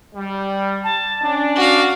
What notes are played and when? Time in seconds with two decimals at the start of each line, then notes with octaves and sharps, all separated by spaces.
0.15 G3
0.84 A5
1.23 C#4 D4
1.56 F#4 F5 D6